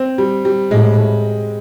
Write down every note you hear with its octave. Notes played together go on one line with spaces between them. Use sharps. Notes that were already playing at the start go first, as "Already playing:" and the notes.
Already playing: C4
G3
G3
A2 G#3